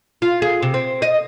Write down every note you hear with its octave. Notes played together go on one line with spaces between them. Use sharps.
F4
G#4
C3
C4
D#5